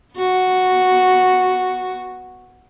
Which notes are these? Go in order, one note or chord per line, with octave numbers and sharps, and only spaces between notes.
B3 F#4